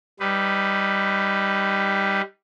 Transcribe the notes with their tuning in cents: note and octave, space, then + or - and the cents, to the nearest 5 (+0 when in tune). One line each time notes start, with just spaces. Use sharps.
G3 +0 D#4 +0 B4 +15